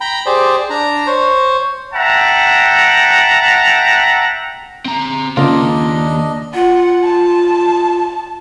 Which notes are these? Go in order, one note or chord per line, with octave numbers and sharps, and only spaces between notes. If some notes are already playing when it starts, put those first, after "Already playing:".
G5 A#5 B5
G4 G#4 C5 D5
D4 A#5
C5 C#5
E5 F#5 G5 A5 A#5
C4 A#5
D#2 C#3 A#3 D4 F4 D#5
F4 F#5
A5